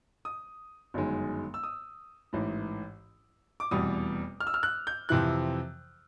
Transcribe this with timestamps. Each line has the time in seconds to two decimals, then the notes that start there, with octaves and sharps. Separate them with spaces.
0.25 D#6
0.94 G1 F#2 D#3 G#3
1.54 E6
1.64 D#6
2.33 A1 G#2 E3
3.60 D6
3.71 F1 E2 B2 G3 D#6
4.40 F6
4.47 E6
4.54 F6
4.63 F#6
4.87 G6
5.09 F2 C3 E3 F#6